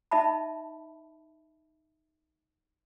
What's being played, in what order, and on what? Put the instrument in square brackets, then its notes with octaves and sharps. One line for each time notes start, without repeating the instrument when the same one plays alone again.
[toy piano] D#4 D#5 E5 A5 B5